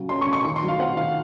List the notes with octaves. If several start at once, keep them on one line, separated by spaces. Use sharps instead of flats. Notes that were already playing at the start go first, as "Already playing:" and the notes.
Already playing: C#3 F#3
C#4 C6
C#6
C#3
C#6
D#3 C#6
C6
F#3
F5
C4 F#5
D#3 F5